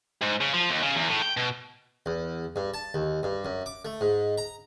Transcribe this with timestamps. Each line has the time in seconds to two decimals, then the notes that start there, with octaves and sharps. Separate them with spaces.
0.21 G#2
0.41 C#3
0.54 F3
0.70 D#2
0.83 C#3
0.96 E2
1.09 A2
1.22 G5
1.37 B2
2.06 E2
2.56 G2
2.74 A5
2.94 D#2
3.23 G2
3.45 F#2
3.66 D6
3.85 A3
4.01 G#2
4.38 A#5